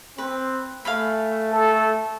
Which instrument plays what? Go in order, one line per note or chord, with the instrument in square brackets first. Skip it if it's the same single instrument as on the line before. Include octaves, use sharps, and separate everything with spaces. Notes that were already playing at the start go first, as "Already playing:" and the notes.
[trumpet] C4 [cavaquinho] B4
[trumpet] A3 [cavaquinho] F5 G#5 B5
[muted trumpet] A4